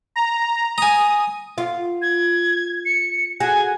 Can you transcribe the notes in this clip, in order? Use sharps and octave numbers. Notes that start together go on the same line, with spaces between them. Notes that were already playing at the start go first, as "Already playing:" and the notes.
A#5
G#5 A#5 D#6
F4
G#6
C#7
F#4 G#4 G#5